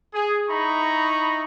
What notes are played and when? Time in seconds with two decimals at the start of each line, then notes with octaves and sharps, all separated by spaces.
0.13 G#4
0.49 D#4 E4 A#5 B5 C#6